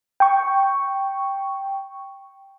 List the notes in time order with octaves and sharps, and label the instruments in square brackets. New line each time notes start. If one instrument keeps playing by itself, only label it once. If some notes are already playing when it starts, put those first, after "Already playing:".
[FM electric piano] G5 C#6